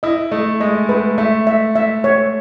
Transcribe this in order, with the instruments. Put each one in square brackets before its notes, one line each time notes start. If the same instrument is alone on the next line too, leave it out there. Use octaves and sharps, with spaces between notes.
[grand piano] E4 [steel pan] D#5
[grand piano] A3 [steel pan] D#5
[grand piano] G#3 [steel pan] D#5
[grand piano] A3 [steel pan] B4
[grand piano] A3 [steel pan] E5
[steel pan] E5
E5
C#5